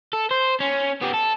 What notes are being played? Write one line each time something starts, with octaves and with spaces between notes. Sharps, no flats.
A4
C5
C#4
B3 G4
A4